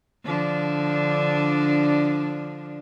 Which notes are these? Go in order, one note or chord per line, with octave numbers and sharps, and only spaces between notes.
D3 F3 D4